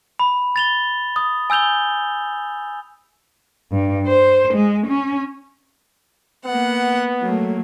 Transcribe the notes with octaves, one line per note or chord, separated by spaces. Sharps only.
B5
A6 F7 G7
D#6
G#5 E6 G6 F7 G7
G2
C5
G#3
C#4
A#3 B3 F#5
F#3 A3 A#3